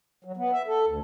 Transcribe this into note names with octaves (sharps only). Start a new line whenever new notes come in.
F#3
B3
E5
A4
D2